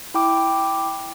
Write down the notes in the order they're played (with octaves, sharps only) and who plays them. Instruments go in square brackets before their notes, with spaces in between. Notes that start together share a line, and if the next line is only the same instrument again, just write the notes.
[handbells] E4 G5 D6